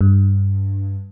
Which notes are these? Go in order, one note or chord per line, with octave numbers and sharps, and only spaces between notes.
G2